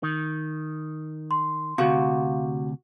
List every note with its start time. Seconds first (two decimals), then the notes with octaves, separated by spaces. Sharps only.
0.03 D#3
1.31 C6
1.78 D2 C3 F#4 F5